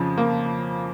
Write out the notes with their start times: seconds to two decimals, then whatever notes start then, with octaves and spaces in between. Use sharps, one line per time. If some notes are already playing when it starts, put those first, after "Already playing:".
Already playing: F2 C#3 F3
0.18 A#3